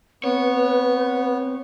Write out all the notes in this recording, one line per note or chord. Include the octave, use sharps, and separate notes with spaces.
B3 C4 B4 C#5